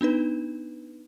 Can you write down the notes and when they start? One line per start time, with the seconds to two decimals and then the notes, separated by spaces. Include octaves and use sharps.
0.01 B3 D4 D#4 B4